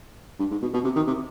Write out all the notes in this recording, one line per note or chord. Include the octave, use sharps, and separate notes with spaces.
G2
G#2
B2
B2
C3
D#3
C3